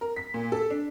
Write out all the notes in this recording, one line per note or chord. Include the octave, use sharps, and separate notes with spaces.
A#4
B6
A#2
A4
D4